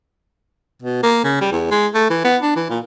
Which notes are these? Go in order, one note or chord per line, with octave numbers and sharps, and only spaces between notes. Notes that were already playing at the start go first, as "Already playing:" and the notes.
B2
A#3
C#3
G3
E2
G#3
A3
E3
B3
D4
E3
A#2